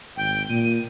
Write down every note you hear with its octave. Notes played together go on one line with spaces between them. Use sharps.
G#1 G5
A#2 D#7